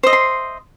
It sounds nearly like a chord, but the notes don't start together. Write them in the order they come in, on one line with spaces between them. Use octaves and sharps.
C5 D#5 E5 C6